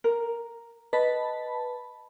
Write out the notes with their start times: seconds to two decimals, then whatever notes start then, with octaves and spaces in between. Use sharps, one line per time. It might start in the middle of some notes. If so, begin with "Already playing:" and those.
0.04 A#4
0.93 B4 D#5 A5 B5